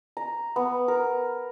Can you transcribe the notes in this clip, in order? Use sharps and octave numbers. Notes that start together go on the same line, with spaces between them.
A#5
B3
A#4